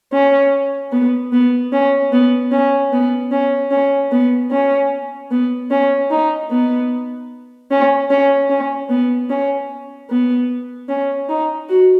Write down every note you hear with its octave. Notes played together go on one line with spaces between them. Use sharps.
C#4
B3
B3
C#4
B3
C#4
B3
C#4
C#4
B3
C#4
B3
C#4
D#4
B3
C#4
C#4
C#4
B3
C#4
B3
C#4
D#4
F#4